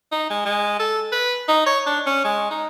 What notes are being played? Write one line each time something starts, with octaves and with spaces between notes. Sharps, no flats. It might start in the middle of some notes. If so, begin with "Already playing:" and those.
D#4
G#3
G#3
A4
B4
D#4
C#5
D4
C#4
G#3
D#4